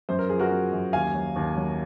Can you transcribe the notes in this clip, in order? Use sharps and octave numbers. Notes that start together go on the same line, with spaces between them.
F#2 C5
A#4
F3 G#4
F#4 A#4
F#2
F#2
D#2 F5 G#5
F#3
D#2
F#3